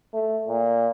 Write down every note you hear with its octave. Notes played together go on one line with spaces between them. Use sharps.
A3
A#2